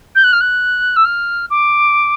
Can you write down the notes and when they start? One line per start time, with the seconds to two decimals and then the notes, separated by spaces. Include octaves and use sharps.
0.15 G6
0.24 F#6
0.33 F6
0.41 F#6
0.96 E6
1.05 F6
1.50 D6